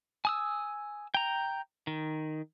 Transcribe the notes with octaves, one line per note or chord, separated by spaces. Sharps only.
G#5 D#6 E6
G5 A#5
D#3